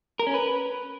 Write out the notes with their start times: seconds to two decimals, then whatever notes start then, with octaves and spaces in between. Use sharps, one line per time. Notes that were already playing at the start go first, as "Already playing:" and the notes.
0.19 A#4
0.27 C#4
0.34 B4